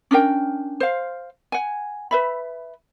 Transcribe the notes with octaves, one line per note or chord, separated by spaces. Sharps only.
C#4 D4 A#4 G5
C5 F5
F#5 G#5
B4 E5 B5